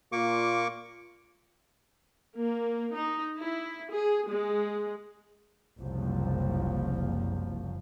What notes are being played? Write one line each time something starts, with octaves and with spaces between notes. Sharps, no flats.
A#2 A#3 F4 C#6 D6
A#3
D#4
E4
G#4
G#3
F#1 C2 F3